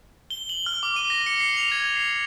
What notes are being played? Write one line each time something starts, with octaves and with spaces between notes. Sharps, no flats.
G7
F#7
F6
D6
D#7
A#6
C#7
C7
F7
G#6
C7